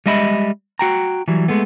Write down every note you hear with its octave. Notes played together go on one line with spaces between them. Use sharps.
G3 G#3 D#5 E5 B5
F#4 G5 A#5
E3 F#3 G3
G#3 A3 B3